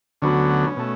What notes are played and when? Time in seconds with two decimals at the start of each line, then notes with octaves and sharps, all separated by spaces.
0.22 D2 D3 F#3 B3 C#4
0.76 B2 A3